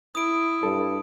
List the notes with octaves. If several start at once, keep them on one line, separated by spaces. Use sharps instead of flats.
E4 D#6 D7
G2 A4